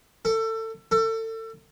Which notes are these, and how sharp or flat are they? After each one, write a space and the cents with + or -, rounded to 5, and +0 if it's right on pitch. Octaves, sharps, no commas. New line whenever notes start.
A4 +25
A4 +30